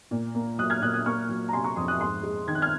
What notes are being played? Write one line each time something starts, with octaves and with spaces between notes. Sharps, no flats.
A#2
A#3
F#3 D#6 F#6
F6 G#6
A#2 D#6 F#6
D#6 F#6
A#3 C#6 F6
F#3
A#5
C3 G#5 C6
A#5 C#6
F2 C6 D#6
D#6 F#6
G#2 C6 D#6
G#3
D#3 G#6
F#6
F6 G#6